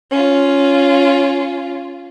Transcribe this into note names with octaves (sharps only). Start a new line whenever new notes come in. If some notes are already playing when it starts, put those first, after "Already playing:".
C#4 F4